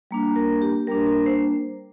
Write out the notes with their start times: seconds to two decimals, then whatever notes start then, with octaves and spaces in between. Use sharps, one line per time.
0.11 G3 A#3 D4
0.36 A#4
0.62 G4
0.87 G3 A#3 D4 A#4
1.07 A#4
1.26 C5